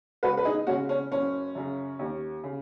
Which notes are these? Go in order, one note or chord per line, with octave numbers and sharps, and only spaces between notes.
C#2 F#4 B4
B4
D#4 G#4
C#3 G#3 C#4 F#4
C#4
F#1 C#4
F#2 C#3
D#2
C#3